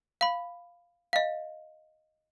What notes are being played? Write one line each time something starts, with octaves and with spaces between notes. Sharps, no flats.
F5 B5
D#5 F5